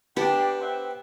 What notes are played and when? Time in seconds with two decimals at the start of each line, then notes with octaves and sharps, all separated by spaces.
0.17 B3 D4 G4 G5
0.61 C5 E5 F#5 G5